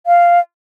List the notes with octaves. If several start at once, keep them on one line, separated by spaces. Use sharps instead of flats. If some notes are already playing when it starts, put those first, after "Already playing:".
F5